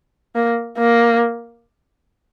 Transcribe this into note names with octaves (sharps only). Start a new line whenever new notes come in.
A#3
A#3